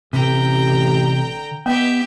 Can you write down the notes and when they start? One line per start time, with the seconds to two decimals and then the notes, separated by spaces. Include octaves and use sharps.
0.13 A1 C3 E3 G5 A#5
0.71 D3
1.66 B3 G4 B4 D#5 E5 G5